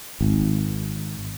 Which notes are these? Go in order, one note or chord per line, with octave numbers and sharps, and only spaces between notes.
G#1